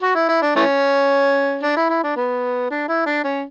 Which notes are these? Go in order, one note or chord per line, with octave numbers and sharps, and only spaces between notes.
F#4
E4
E4
D4
E3 A3 C#4
D4
E4
E4
D4
B3
D4
E4
D4
C#4